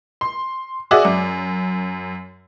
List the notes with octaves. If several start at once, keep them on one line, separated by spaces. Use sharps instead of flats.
C6
F#4 G#4 D5 E5 D6
F#2